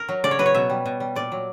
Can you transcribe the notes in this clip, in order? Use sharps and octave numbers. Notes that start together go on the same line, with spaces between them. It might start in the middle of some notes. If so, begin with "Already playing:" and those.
Already playing: A#4
F#3
C#3 D5
C#5
F#3 B4
C#5
B2 E5
G3
B2
G3
A#2 D5
F#3